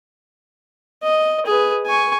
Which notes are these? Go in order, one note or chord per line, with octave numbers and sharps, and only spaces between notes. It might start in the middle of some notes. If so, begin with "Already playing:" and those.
D#5
G#4 B4
G#5 C#6